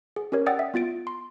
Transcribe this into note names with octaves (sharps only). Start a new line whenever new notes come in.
G#4
C#4 G4 A#4 C#5
D5 F#5 G5 D#6 E6 A6
E5
B3 F4 A6 D7
C6